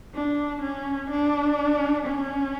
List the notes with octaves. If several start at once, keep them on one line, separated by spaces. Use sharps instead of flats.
D4
C#4
D4
C#4